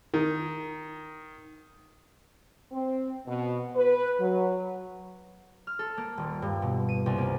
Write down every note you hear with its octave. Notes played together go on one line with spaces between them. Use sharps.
D#3
C4
B2
B4
F#3
F6
A4
A#3
D#1
G2
B2
D#7
C2
A#3